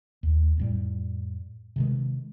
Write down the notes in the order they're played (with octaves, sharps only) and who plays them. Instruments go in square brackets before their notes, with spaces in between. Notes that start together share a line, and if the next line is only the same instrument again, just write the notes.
[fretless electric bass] D#2
F2 A2 G3
C3 D#3 G#3